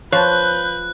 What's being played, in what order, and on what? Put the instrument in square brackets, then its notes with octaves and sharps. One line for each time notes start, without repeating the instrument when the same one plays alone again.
[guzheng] F3 [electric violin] B4 G6 [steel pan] C#5 [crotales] F#6